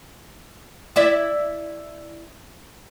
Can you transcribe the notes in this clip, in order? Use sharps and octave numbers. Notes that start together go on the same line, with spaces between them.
E4 D5 E5